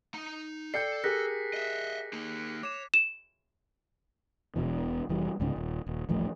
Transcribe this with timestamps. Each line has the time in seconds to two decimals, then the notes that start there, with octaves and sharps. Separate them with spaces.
0.14 D#4 A#5
0.74 A4 D5 G5 G6 C7 C#7
1.04 G4 G#4 A#4 F#6 A#6 B6
1.53 D#5 E5
2.13 A#3 D#4
2.63 C#5 D6 E7
2.94 E7
4.56 E1 B1 B2 E3
5.09 F1 E3 G3
5.40 C2 G#2 C#3
5.56 D#1
5.87 D#1
6.09 D#1 A1 F3 A3